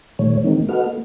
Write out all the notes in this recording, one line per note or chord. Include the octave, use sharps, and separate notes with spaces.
A#2 D#3 G3 A3 C#5
D#3 E3 G#3 A#3 C4 D#4
F#4 A4 B4 D#5 F#5 F6
A#3